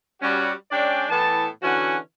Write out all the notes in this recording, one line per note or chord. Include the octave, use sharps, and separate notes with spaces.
G3 C#4 F#4
G#3 C#4 D4 D5 G5
A2 E3 B3 A5
D3 E3 C#4 F#4 F#5 G#5